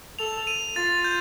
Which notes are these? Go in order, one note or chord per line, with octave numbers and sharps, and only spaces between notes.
A4 F7
D#7
F4 A6
G6